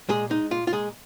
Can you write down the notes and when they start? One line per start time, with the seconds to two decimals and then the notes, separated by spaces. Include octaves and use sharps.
0.09 A#2 G#3 G#4
0.30 G#3 D#4
0.51 A#2 F4
0.67 F4
0.72 A#2 G#3 G#4